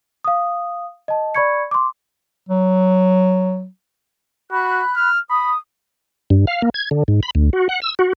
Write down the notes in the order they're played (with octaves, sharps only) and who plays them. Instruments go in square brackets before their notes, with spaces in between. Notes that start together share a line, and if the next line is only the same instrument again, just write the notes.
[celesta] F5 D#6
D#5 A5
D5 B5 C#6 G#6 C#7
C6 D6
[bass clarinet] F#3
[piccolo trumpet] F#4 [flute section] B5 F#6
[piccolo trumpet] F6
[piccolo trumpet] B5 [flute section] D#6
[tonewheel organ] G2
F5
A#3
G#6
D3
G#2
B5
D2
F#4
F#5
E6
F#4